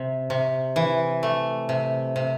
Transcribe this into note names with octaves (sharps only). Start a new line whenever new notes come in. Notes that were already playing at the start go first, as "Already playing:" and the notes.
Already playing: C3
C3
E3
A3
C3
C3